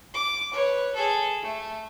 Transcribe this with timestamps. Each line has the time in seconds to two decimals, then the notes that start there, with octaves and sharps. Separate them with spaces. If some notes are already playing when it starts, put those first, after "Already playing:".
0.14 D6
0.53 B4 C#5
0.95 G#4 A4
1.42 A3